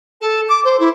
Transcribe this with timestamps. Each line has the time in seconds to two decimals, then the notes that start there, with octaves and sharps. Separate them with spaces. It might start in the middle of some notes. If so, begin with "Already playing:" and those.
0.21 A4
0.48 D6
0.64 C5
0.79 E4